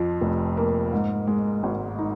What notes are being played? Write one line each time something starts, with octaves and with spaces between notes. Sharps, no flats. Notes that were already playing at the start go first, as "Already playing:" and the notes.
Already playing: F2 F3
F1
A#3
G#2
G#3
G#1
D#4